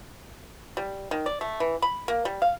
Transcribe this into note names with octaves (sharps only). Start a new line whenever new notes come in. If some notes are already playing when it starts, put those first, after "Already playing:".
G3
D#3
D5
A3
E3
B5
A#3
G3
F5